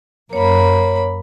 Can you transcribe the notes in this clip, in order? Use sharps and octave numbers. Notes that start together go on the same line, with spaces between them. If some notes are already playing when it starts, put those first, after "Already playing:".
F#2 A#3 C#5 B5